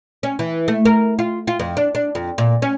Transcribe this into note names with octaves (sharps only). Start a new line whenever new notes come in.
C#4
E3
A3
A#4
F4
F4
F2
D4
D4
F2
A#2
C#4